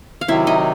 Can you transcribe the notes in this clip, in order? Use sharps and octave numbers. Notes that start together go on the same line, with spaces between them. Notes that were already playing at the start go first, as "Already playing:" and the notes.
F5
C3 D#3 F#3 E4 E5
D#4 D#5